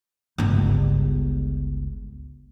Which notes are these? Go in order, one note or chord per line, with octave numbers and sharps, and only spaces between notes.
G1 C#2